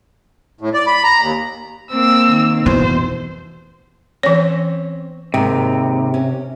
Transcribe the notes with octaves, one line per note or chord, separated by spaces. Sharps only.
A2
D5
B5
A#5
D#2
A#3 C4 E6
D#3
F1 B2 E3 C5
E3 C4 C#4 C#5
D#2 G#2 C3 D#4
C#4